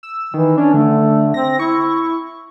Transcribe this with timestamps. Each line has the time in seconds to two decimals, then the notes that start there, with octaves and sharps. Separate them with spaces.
0.03 E6
0.34 D#3 E3
0.58 C#4 D4
0.74 D3 A3
1.34 C4 A#6
1.59 E4 C#6